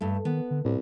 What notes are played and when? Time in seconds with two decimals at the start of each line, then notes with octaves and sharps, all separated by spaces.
0.01 G2 A3
0.25 D#3 B3
0.51 D3
0.65 C2 A2